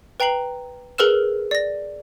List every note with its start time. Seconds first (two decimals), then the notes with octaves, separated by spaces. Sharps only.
0.20 B4 G5 A#5 C7 F#7
0.98 G#4 A#4 B4 E6 F6 E7
1.51 D5 A#6